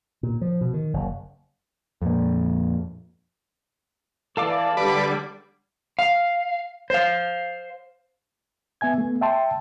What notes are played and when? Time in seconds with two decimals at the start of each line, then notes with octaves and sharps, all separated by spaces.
0.23 A#2
0.41 F3
0.61 B2
0.74 D#3
0.94 F#1
2.02 F2 A#2
4.37 E3 A4 D5 F5 D6
4.77 D3 G3 B4 D5
5.99 F5
6.90 C5 F5
8.81 B3 E5 G#5 G#6
8.98 A3 B3
9.21 E5 G5 A5 C6